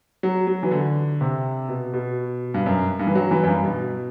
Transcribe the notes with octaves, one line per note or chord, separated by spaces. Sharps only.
F#3
F#3
E3
D3
C3
B2
B2
G2
F#2
G2
E3
F#3
E3
F#2
G2
B2